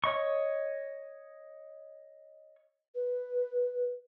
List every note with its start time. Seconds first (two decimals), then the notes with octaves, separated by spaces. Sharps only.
0.04 C#5 D#5 C#6
2.95 B4